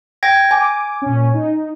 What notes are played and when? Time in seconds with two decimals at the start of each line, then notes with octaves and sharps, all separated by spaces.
0.23 G5 G#6 A#6
0.51 G#5 D6
1.02 A#2 C#4
1.34 D#4